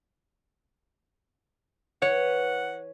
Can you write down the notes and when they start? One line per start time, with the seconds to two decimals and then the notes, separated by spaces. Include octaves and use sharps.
2.02 E3 B4 C#5 F#5